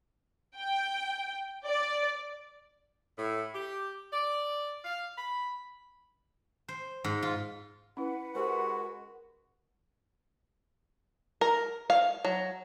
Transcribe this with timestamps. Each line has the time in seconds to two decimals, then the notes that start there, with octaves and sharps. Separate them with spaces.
0.59 G5
1.66 D5
3.18 A2
3.54 G4
4.13 D5
4.85 F5
5.16 B5
6.68 C5
7.04 G#2
7.22 F4
7.97 C#4 E4 B4 F#5
8.35 G#3 F#4 G4 A#4 C5
11.41 A#4
11.90 F5
12.25 F#3